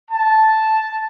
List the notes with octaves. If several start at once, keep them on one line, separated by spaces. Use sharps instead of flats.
A5